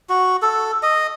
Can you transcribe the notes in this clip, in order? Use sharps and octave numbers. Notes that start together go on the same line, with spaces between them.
F#4
A4
D#5